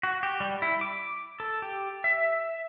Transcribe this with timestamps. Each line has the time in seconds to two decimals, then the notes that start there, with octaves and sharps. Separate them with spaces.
0.03 F#4
0.23 G4
0.40 G3
0.62 E4
0.81 D6
1.40 A4
1.62 G4
2.04 E5